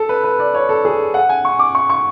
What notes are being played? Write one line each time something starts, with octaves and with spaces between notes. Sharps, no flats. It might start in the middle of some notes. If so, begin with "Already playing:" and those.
Already playing: A4
B4
B4
D5
C#5
A4
G#4
F#5
G#5
C#6
D6
C#6
C#6